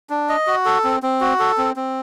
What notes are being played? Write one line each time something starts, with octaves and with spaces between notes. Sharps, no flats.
D4
D#5
F#4
A4
C4
C4
F#4
A4
C4
C4